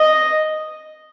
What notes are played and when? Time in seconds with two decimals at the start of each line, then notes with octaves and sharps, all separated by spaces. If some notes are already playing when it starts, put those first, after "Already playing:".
Already playing: D#5